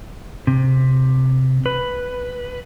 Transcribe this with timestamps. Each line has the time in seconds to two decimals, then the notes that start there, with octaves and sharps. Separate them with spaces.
0.47 C3
1.66 B4